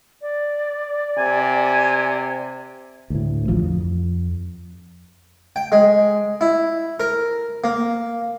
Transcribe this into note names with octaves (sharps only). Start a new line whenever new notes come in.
D5
C3 G#5
D2 A2
A1 F3
F2
G5
G#3
E4
A#4
A#3